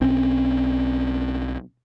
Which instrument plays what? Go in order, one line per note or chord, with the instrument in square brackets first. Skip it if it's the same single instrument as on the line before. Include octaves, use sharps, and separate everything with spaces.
[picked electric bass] B1 C4 C#4